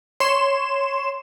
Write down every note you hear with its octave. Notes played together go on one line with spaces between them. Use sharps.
C#5 C6 E7